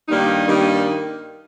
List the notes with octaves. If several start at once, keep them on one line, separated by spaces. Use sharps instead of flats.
G2 D#3 G3 A#3 D#4
G2 D#3 G3 A#3 D#4